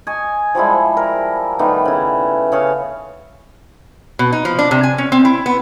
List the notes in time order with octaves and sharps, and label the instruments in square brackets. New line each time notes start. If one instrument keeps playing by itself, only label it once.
[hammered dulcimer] D#5 G#5 C#6
F3 G3 G#3 E4
A#4
D#3 G3 A3 B3
C#3 E4
C#3 G#4 C#5 F5
[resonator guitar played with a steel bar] B2
D#4
F3
D4
C3
G#5
C#4
C4
E4
B3